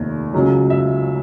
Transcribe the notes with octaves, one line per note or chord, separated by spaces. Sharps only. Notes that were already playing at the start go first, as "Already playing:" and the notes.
Already playing: F1 D#2 D#3
C#2 C#3 F#3
E5